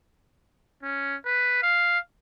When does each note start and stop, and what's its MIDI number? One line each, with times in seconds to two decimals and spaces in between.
0.83 1.16 61
1.25 1.60 71
1.62 1.98 77